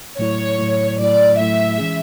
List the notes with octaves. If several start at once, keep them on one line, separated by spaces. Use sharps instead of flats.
A2 F#3 A3 E4 C#5
A2 F#3 A3 E4
A2 F#3 A3 E4 D5
A2 F#3 A3 E4 E5
E3 G#3 C#4 G#4